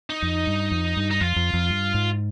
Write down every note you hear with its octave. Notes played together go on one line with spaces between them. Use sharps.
D#4
F2
G2
F2
G2
D#4
F2 F4
F2
F2
G2
G#2